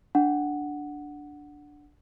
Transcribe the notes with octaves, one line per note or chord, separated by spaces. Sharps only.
D4 F#5